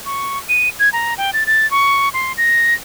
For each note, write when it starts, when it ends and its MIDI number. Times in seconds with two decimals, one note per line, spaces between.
0.06 0.38 85
0.49 0.69 99
0.79 0.89 92
0.93 1.14 82
1.18 1.31 79
1.33 1.46 93
1.46 1.69 93
1.71 2.09 85
2.14 2.33 84
2.38 2.74 94